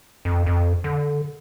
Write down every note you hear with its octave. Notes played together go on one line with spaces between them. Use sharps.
F2
F2
D3